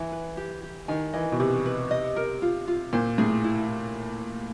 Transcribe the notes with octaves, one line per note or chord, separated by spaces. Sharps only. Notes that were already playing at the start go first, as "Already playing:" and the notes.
Already playing: E3 E5
B4
G4
G4
D#3 G#5
E3 D#5
B2
C3 B4
B4
D#5
A#4
F4
F4
A#2 C5
A2 G#4
E4